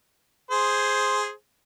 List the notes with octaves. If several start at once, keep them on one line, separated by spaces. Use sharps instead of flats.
G#4 C5